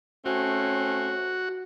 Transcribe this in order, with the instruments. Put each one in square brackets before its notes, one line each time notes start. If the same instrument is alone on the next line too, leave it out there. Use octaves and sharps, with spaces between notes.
[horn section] A3 C4 C#4 [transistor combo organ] F#4